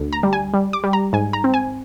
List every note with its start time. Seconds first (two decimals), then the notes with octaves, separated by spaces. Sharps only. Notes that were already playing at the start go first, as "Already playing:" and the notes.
Already playing: D2
0.13 A#5
0.23 G3
0.33 G#5
0.54 G3
0.73 D6
0.84 G3
0.93 A#5
1.13 G#2 G#5
1.33 A#5
1.44 C4
1.54 G#5